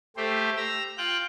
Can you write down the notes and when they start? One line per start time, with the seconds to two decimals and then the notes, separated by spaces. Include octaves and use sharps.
0.17 A3 G4 C5
0.57 A#5 E6
0.98 F4 G5 F#6